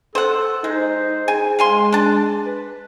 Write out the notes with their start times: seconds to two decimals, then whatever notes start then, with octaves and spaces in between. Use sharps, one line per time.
0.15 A4 C5 F#5
0.64 G#3 D#4 C5
1.28 G#4 G#5
1.59 G#3 F5 G#5 C6
1.92 D4 A5
2.46 B4